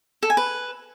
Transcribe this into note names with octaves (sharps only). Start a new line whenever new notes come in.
A4
G#5
B4